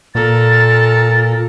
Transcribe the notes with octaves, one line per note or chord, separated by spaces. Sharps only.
A#2 A4 A#4 A6